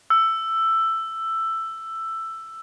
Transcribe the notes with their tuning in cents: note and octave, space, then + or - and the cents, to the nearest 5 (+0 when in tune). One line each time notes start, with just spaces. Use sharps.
E6 +10